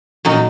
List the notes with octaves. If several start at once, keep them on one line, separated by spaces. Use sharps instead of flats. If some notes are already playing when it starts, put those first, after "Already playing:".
A#2 F#3 D#4